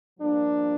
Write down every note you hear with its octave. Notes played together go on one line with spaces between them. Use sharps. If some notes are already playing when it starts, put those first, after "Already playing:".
G2 F3 A#3 D4